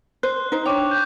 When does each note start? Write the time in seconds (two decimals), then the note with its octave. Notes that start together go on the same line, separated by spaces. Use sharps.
0.23 C5 F#6
0.52 D#4 C5
0.66 D4 C#5 G5 C#6 D6 F7
0.91 G6